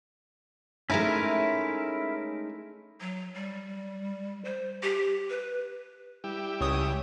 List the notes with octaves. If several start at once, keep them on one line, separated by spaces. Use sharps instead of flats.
G#3 A3 C#4 D#4 E4 A#4
F#3
G3
C5
G4
B4
G3 E4 G4
C#2 C#5 D#6